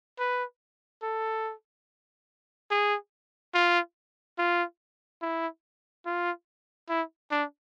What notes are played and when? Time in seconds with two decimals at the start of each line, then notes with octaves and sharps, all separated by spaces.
0.19 B4
1.03 A4
2.71 G#4
3.54 F4
4.38 F4
5.22 E4
6.06 F4
6.89 E4
7.31 D4